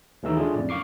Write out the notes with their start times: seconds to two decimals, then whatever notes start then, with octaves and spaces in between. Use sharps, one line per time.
0.23 D#2 E3 F#3 A3 D#4 E6
0.37 G#3 A3 C#4 D4 F4 G#4
0.55 F2 A2 D5
0.69 F#2 F5 C#6 D6 C7